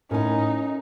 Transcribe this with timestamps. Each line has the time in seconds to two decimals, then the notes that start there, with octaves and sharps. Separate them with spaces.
0.11 A2 C#4 D#4 A#4 G#5